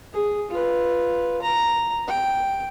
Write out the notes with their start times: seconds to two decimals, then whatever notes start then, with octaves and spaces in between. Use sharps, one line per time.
0.14 G#4
0.51 F4 B4
1.42 A#5
2.08 G5